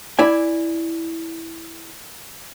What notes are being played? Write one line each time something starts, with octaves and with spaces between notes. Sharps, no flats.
E4 D5 G#5